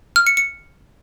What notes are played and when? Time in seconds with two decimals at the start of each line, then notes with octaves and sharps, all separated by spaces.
0.16 F6
0.27 C#7
0.37 C#7